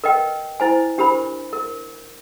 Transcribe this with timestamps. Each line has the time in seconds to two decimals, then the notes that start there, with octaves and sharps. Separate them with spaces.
0.04 A#4 B4 D#5 G5
0.60 E4 C5 G#5
0.98 D4 G4 A#4 C5 B5
1.53 A#4